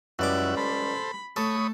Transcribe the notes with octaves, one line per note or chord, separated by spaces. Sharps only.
C#2 F#2 G3 E4 F#5 D6
A4 C5 B5
A3 A4 C#5 B5 D#6